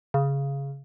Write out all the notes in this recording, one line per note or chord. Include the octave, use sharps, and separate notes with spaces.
C#3